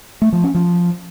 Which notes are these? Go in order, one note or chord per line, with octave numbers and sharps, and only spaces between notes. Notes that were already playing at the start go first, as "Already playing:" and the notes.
A3
F3
C#4
F3